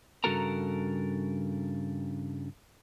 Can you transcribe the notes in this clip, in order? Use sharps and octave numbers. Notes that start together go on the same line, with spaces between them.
G2 C#3 F#4 A4 A#4 A#5